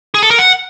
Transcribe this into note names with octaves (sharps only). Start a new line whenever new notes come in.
G#4
A4
A#4
F#5